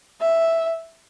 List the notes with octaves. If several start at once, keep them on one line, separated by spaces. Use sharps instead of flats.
E5